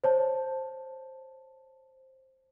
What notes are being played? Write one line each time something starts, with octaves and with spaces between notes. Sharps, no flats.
C5 C#5 A5